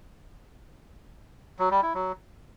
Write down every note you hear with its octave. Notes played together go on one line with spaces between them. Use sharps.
F#3
G3
E4
F#3